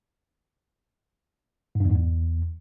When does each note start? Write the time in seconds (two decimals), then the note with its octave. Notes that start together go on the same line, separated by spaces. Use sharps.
1.75 G#2
1.80 G2
1.85 E2
1.90 G#2
1.95 E2